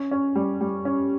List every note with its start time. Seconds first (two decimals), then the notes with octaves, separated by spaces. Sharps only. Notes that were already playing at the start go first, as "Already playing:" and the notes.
Already playing: C#4
0.11 C#4
0.35 G3
0.61 G3
0.85 C#4